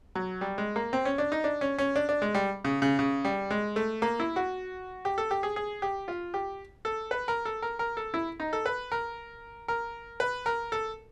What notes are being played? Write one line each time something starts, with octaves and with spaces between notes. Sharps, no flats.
F#3
G3
G#3
A#3
C4
C#4
D4
D#4
D4
C#4
C#4
D4
D4
G#3
G3
C#3
C#3
C#3
G3
G#3
A3
A#3
E4
F#4
G4
A4
G4
G#4
G#4
G4
F4
G4
A4
B4
A#4
A4
A#4
A#4
A4
E4
D#4
A4
B4
A#4
A#4
B4
A#4
A4